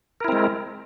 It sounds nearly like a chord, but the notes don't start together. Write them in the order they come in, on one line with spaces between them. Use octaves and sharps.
A#4 E4 C4 G#3